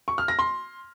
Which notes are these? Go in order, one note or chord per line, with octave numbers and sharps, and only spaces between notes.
C#6
F6
A#6
C6